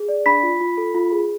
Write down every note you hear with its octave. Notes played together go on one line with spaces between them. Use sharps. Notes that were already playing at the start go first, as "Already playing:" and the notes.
Already playing: G#4
D5
D4 B5 B6
F4
F4
A4
F4
G#4